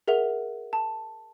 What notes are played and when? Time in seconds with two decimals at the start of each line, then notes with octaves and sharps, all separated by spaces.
0.08 G#4 A#4 E5 F#5 F7
0.73 A5